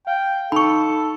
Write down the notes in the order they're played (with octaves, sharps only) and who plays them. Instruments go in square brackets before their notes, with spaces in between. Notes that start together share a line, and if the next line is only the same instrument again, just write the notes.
[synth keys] F5 [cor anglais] G5
[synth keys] D#4 C#7 [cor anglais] A4 [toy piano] B5 C#6